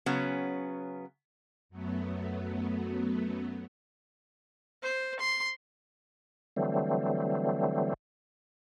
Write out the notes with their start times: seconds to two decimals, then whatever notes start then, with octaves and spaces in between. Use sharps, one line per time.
0.06 C#3 F#3 B3 C#4
1.69 F#2 F#3 A3 B3
4.82 C5
5.19 C6
6.56 D3 E3 F#3 G3 A3 C4